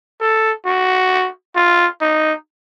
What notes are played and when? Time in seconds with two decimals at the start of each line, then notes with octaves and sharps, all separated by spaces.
0.21 A4
0.66 F#4
1.56 F4
2.01 D#4